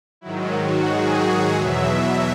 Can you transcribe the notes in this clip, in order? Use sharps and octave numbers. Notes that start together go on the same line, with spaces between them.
G#2 D#3 F#3 E4
F#4
G#4
E2 B2 F#3 E5